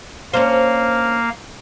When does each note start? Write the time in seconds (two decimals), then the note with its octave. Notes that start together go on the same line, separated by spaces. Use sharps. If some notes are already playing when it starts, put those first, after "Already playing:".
0.33 A#3 C#4 D4 C5 F5